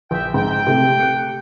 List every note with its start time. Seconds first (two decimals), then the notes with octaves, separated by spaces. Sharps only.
0.11 A#1 E5 G5
0.34 G#2 G5
0.67 C3 A3
1.00 F#6 C#7